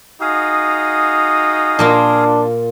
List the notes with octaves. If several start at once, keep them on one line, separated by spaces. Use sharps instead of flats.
D#4 F#4 G#4 F5 D#6
A#2 A#3 D4 F4